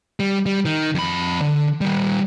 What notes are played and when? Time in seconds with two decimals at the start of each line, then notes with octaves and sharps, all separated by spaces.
0.20 G3
0.46 G3
0.65 D#3
0.95 F2 B5
1.42 D3
1.81 D#3 G3